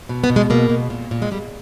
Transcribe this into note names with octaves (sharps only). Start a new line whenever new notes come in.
B2
B3
B2
G#3
B2 A#3
B2
A#2
A#2
G#3
A#2 G3